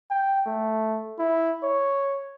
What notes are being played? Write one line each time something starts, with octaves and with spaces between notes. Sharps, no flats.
G5
A3
E4
C#5